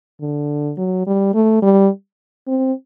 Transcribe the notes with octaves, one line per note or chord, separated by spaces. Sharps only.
D3
F#3
G3
A3
G3
C4